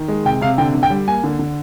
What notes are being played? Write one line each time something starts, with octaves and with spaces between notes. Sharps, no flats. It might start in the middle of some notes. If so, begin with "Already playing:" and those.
Already playing: D#3
G#3
C3 G5
C3 F5
D3 G5
D3
G5
G3
A#3 G#5
D3
D3